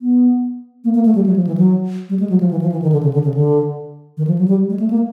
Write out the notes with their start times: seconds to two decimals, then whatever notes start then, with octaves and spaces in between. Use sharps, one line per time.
0.02 B3
0.84 A#3
0.94 A#3
1.05 A3
1.15 G3
1.26 F#3
1.36 F3
1.47 E3
1.57 F#3
2.09 G3
2.20 G#3
2.30 F#3
2.40 F3
2.51 E3
2.62 F3
2.72 E3
2.82 D#3
2.92 D3
3.03 C#3
3.13 D3
3.24 C#3
3.34 D3
4.17 D#3
4.27 F3
4.38 F#3
4.48 G3
4.70 G#3
4.80 A3
4.90 A#3